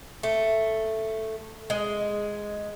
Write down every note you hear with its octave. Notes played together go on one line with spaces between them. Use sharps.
A3
G#3